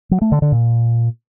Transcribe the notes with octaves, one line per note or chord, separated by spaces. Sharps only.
F#3
A3
D3
D3
A#2